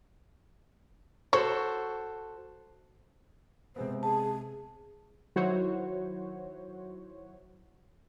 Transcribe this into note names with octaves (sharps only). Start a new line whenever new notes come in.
F#4 A4 C5 C#5
C3 G#3 B3 C5
G#4 A5
D#3 F#3 E4 F#4 C5 C#5